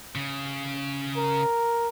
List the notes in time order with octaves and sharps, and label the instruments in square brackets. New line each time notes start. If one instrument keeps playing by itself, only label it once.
[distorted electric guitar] C#3
[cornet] A#4